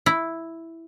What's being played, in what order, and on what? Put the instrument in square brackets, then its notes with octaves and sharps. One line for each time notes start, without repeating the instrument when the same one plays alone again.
[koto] E4